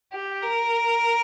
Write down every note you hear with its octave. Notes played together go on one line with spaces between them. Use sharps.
G4
A#4